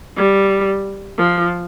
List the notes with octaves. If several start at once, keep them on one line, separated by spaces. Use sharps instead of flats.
G3
F3